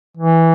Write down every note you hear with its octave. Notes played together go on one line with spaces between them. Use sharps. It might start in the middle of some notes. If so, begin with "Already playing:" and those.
E3